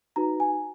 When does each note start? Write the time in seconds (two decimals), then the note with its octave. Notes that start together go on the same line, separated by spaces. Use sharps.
0.16 D#4 F#4 B4 A#5
0.40 G#5